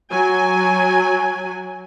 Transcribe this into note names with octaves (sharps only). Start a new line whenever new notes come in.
F#3 G#5